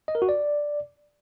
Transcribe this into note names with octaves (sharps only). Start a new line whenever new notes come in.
D#5
A#4
F#4
D5